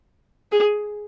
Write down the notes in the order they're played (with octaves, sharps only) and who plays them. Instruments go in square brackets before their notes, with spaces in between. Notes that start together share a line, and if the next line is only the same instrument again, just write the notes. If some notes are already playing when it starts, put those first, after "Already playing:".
[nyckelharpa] G#4